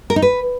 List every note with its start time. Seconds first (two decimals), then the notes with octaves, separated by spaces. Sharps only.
0.10 A#4
0.16 D#4
0.22 B4